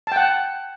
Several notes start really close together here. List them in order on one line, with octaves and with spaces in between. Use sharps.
A5 G5 F#5